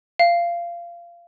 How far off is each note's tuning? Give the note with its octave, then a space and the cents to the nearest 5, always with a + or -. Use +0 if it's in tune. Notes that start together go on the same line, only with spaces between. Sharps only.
F5 -20